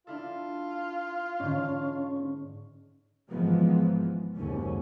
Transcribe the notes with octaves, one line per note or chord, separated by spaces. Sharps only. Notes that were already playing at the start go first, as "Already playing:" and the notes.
D4 E4 F4 A4
G#2 D3 C#4
G#1 G#2 E3 F3 G#3 B3
F#1 D#2 G#2 B2 D3 C#4